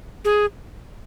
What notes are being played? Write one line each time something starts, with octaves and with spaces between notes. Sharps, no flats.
G#4